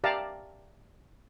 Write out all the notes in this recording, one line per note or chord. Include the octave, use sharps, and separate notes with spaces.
G4 D5 E5 F5 A5 A#5